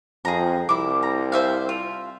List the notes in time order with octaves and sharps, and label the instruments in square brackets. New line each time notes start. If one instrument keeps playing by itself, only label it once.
[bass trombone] F2 [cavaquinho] G#4 A#5
[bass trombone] C2 [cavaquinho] E4 D6
[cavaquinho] A#5
C5 E5 F5
F4